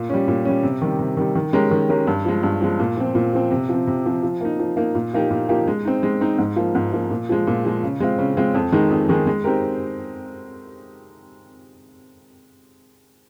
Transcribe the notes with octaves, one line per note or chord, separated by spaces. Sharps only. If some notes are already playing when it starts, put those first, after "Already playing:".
Already playing: A#2
G3 C#4
A#2
G3 C#4
C3
D#3 G3
C3
D#3 G3
D#3
G#3 C#4 G4 A#4
D#3
G#3 C#4 G4 A#4
G2
F3 G#3
G2
F3 G#3
A#2
F3 C4
A#2
F3 C4
C3
F3 C4
C3
F3 C4
F3
A#3 D#4
F3
A#3 D#4
A#2
F3 A#3 D#4 G4
A#2
F3 A#3 D#4 G4
G#3
C4 D#4
G#3
C4 D#4
G#2
F3 A#3
G#2
F3 A#3
A#2
F3 G#3
A#2
F3 G#3
C#3
G#3 C4 F4
C#3
G#3 C4 F4
F2
D#3 G#3 D#4 G#4
F2
D#3 G#3 D#4 G#4
G#3
C4 D#4 G4 A#4